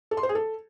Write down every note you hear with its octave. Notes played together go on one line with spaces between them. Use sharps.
A4
C6
C5
G#4
A4